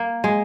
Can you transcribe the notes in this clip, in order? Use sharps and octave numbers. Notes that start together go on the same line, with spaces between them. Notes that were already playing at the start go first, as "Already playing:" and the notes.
Already playing: A#3
G#3